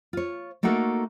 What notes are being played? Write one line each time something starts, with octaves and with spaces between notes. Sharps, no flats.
F4 C#5
A3 A#3 D#4 F#4 A4 A#4